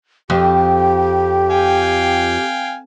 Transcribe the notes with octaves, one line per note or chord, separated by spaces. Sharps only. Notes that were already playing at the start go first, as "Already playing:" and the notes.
F2 G4
F5 G5 G#5